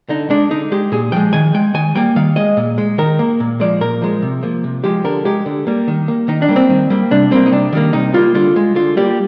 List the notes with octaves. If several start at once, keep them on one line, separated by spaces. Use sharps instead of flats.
D3 D#4
G#3 D4
D3 D#4
G#3 G4
A#2 G#4
F3 G#3 G5
D#3 G#5
G#3 G5
D#3 G#5
G3 A#3 G5
D#3 F5
G#3 D#5
A#2
G#3
D#3 A#4
A#3
A#2
F3 G#3 D5
A#2 A#4
F3 G#3
C3
F3 A#3
C3
F3 G#3 G4
D3 A#4
G#3 G4
D3
G3 A#3
D#3
A#3
D#3 D#4
D4
G3 A#3
C4
D#3
G3 A#3
C3 D4
G3 A#3 C4
D#4
C3 D4
D#3 G3 A#3
C3 D#4
G3 A#3 F4
D3 F4
G#3
D3 F4
G3 A#3 G4